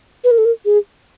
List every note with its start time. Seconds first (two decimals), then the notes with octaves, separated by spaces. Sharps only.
0.24 B4
0.31 A#4
0.38 A4
0.45 A#4
0.65 G#4